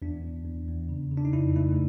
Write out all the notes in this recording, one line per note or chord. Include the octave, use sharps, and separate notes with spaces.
E2 D4
E2
E2
E2
C#3
C#3
D4
D#4
F2 E4
A3 E4